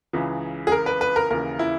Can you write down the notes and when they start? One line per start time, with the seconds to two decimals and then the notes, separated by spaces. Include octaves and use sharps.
0.13 C#2 C#3 E3
0.67 G#4
0.72 A#4
0.86 B4
1.01 B4
1.16 A#4
1.30 D#2 C#3 E3 A#4
1.59 E4